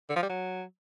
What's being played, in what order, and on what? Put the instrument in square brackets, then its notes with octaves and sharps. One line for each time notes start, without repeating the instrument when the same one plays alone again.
[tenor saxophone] D3
F3
G3
F#3